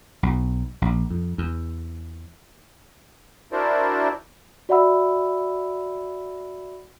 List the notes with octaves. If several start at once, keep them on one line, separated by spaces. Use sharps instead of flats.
B1
A#1
F2
E2
D4 E4 F#4 A#4 C5 D5
F#4 D5 E5 F#5 B5 E6